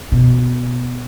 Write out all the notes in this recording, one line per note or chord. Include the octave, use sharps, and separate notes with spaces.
B2